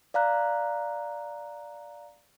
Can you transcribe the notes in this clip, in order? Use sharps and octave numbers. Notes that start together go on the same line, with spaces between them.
D5 F5 A#5 F#6